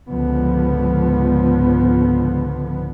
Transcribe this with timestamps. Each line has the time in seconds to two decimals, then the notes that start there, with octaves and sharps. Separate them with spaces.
0.11 C#2 G#2 D3 F3 B3